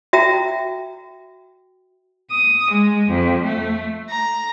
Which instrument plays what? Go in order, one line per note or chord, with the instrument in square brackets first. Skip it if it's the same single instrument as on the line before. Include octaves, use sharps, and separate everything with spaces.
[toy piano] F#4 E5 G5 A#5
[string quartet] D#6
G#3
F2
A3
A#5